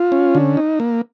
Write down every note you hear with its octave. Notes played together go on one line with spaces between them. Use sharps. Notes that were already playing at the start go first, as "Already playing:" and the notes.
Already playing: F4
C#4
D3
D#4
A#3